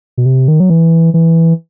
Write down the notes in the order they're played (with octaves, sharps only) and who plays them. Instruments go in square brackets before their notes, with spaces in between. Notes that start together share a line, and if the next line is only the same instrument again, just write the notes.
[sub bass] B2
C3
D#3
F#3
E3
E3